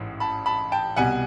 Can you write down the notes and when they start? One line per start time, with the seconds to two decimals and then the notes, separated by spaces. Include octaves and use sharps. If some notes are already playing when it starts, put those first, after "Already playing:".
Already playing: A1 G#2 E3
0.20 A5 B5
0.46 A5 B5
0.72 G5 A5
0.96 C2 B2 G3 F#5 G#5